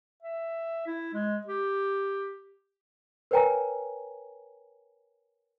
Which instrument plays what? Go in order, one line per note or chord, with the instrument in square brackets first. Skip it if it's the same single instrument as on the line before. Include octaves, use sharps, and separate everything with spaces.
[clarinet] E5
E4
G#3
G4
[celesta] A#4 B4 C#5 G5 G#5 A#5